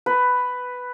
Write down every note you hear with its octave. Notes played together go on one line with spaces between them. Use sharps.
B4